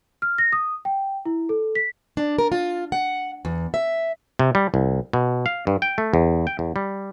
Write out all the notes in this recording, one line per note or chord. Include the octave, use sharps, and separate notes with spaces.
F6
A#6
D#6
G5
E4
A4
B6
D4
A#4
F4
F#5
E2
E5
C3
G3
C2
B2
F5
G2
G5
A3
E2
G5
E2
G3